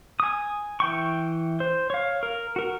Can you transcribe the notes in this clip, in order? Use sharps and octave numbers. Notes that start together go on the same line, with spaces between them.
G#5 D#6
E3 G5 C#6
C5
C#5 F5
A#4
F#4 A#4